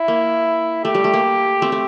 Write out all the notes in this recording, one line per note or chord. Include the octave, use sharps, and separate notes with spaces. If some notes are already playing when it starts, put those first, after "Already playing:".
Already playing: E4
A#3
A3 G4
G3
A3
A#3
A3 C4
A3